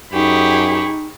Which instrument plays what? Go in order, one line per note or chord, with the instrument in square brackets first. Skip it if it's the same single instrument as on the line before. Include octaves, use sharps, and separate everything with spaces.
[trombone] F#2 [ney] D#4 [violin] G4 G#4 [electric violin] B5 C#6